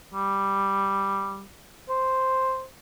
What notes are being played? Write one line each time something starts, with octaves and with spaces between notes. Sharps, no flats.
G3
C5